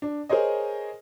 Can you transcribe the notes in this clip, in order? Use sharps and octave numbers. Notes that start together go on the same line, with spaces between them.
D4
G#4 A#4 C5 C#5 D#5